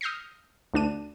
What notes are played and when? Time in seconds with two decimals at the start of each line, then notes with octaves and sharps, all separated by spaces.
0.01 D#6 F6 G6 A#6 C7
0.74 D2 D4 D#7